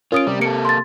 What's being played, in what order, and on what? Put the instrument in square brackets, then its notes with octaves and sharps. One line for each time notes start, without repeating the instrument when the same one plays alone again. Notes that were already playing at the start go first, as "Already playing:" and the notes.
[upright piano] C#4 [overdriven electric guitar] F4 [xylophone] A#4 D#6 D7
[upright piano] C3 [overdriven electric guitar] G3
[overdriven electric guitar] A#3 A4 [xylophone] C#7 D7
[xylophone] C6 A6